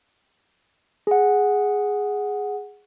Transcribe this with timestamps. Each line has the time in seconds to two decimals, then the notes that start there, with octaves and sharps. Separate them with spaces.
1.07 G#4 F#5